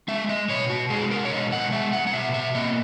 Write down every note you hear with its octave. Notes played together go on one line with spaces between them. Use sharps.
G#3 E5
D#5
B2 C#5
F#4
G#3 G#4
A#4
C#5
B2 D#5
F#5
G#3 E5
F#5
F#5
B2 E5
E5
A#3 D#5